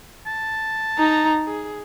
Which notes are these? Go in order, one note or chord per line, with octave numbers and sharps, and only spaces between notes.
A5
D#4 A#5
G#4